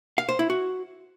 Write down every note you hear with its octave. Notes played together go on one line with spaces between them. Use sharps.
F5
C5
E4
F#4